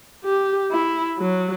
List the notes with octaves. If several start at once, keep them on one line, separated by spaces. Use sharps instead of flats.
G4
E4
F#3